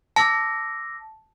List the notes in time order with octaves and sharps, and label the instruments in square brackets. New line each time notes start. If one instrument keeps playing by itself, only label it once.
[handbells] A5 [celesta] D6 E6 A#6